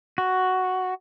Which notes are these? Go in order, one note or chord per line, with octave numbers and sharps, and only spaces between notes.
F#4